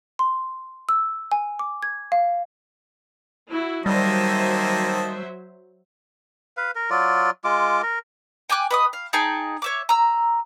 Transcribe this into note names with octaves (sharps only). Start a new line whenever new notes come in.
C6
E6
G#5
D6
G#6
F5
E4 F#4
D#3 F#3 G3 A#3 C5 D#5 E5 A5
B4 F5
A#4
F#3 F4 D5
G#3 F4 D6
A#4
G5 G#5 D6 F#6
B4 D#5 D#6
F5
D#4 G#4 G5 A5
C#5 E5 D6
A#5 E6